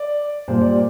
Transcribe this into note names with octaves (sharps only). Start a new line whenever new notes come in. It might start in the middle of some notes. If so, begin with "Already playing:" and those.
Already playing: D5
A#2 G3 A#3 C5
D5